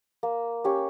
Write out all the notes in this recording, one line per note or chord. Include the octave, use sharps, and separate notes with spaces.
A#3
C#4 G4 C#5